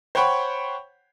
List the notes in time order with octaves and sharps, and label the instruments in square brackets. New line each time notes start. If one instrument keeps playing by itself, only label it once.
[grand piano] C5 C#5 F#5 G5 B5 C#6